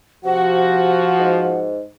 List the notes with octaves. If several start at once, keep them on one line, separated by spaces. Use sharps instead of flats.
C3 F3 F#4 F#5
G#2